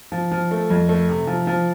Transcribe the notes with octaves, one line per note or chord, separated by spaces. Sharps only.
F3
F3
A3
F2
A3
C3
F3
F3